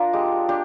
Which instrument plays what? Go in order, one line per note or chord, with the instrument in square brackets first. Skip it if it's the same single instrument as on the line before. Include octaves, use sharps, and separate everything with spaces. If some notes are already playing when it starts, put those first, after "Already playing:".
Already playing: [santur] D4 F4 A#4
G#3 G4
D4 G4